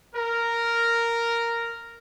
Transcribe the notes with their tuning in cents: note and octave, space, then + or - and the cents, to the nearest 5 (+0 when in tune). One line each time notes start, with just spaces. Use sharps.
A#4 -5